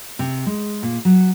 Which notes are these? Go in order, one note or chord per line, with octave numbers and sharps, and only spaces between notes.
C3
G#3
A#2
F#3